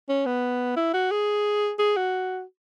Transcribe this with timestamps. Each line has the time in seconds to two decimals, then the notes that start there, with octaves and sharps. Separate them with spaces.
0.09 C#4
0.26 B3
0.77 E4
0.93 F#4
1.11 G#4
1.79 G#4
1.96 F#4